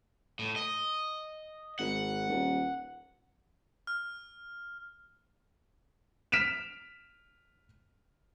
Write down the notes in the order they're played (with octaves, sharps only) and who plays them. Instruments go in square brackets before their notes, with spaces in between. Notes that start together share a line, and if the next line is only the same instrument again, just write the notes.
[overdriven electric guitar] A2
D#5
[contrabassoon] G#1 [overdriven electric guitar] F#5
[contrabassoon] D#1
[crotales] F6
[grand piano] F6 B6 D7 E7 F7